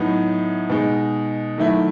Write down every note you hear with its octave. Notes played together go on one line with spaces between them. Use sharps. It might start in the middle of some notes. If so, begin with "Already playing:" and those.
Already playing: A2 F#3 B3 D#4
B2 G#3 D#4
D#3 F#3 A3 E4